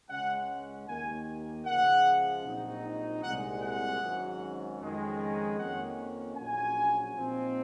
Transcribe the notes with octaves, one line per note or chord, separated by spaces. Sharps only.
C#2 C#3 G#3 C#4 F#5
D#2 D#3 A#3 G#5
C#2 C#3 F3 G#3 F#5
A#1 A#2 F#3 C4 D#4
C2 A#2 G#3 F#5
F#5
G#1 G#2 F#3 C#4
F2 D#3 G#3 C#4
F2 D#3 A#3 C#4 F#5
A#1 A#2 F#3 C#4 G#5
A#2 F3 C4 D#4